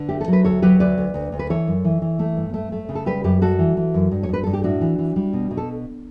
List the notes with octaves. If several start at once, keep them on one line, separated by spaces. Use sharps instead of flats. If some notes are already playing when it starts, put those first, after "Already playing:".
Already playing: D3 B4
A3 G4
A4
F#3
B4
D2 A4 C#5
F#3 G4 B4
D2 B4 D5
D2
D2
D2
B4
E3 A4 C#5
F#2
E3
E3
A3
G2
A3
A3
C#3
A4
G3 G4 B4
F#2 G4 B4
G3 F#4 A4
E3
E3
F#2
G2
C#5
G2 B4
G2 A4
G4
A2 D4 F#4
E3
E3
G3
B2
B2
A4